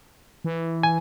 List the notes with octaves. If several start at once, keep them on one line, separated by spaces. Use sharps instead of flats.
E3
G#5